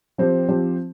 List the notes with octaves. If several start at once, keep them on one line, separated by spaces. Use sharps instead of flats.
F3 C4 G4 C5
F3 C4 G4 C5